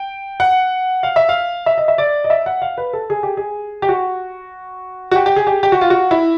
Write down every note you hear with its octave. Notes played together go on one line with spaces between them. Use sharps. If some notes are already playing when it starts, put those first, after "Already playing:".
Already playing: G5
F#5
F5
E5
F5
E5
D#5
E5
D5
D#5
E5
F#5
F5
B4
A4
G#4
G4
G#4
G4
F#4
F#4
G4
G4
G#4
G4
G4
F#4
F4
F#4
E4